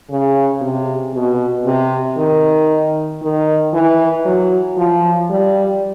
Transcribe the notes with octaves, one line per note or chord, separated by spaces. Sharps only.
C#3
C3
B2
C3
D#3
D#3
E3
F#3
F3
G3